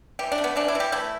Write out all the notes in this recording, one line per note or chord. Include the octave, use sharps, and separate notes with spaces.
E3 G4
D4
A3
B3
E3 D4
E4
E3
G4
A3 E4